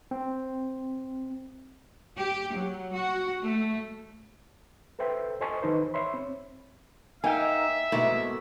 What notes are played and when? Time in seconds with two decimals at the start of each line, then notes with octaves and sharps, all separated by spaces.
0.11 C4
2.17 G4
2.54 F#3
2.92 F#4
3.42 A3
4.99 A4 B4 C5 E5 G5
5.41 A4 C5 D#5 G#5 A5 C#6
5.62 D#3 E3 D#4 B4 C5
5.94 C#5 E5 B5 C6
6.14 C4
7.24 A#3 D#4 E5 G5 G#5
7.92 G#2 B2 A3 A#3 E4